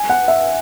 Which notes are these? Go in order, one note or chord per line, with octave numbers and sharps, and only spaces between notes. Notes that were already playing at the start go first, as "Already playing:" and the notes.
Already playing: G#5
F#5
E5